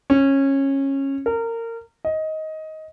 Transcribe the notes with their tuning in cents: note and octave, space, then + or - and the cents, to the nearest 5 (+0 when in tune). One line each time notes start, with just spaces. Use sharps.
C#4 -20
A#4 -25
D#5 +15